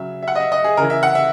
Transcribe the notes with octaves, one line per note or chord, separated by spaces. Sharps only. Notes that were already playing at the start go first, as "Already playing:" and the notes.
Already playing: C#3 F#3 E5
E5
F#5
D#5
E5
D#5
G#4
C#3 E3 A#4
E5
F#5
E5